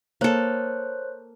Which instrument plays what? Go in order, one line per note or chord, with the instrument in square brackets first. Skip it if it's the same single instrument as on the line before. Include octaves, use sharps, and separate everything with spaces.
[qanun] A#3 A4 [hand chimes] C5 C#5 F#6